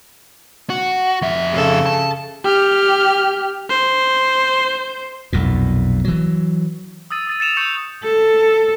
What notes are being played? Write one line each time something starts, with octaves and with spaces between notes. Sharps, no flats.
F#4
F2 E5
C#3 A4
A5
G4 F6
C5
B1 F2 A#2
E3 F#3
D#6 E6 A6 D#7
D#6 A6 D#7
A6 C#7 E7 F7
C#6 E6 G6 C#7 F7
A4